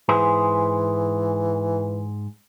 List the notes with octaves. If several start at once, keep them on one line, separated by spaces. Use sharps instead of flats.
G#2 E3 G#4 C5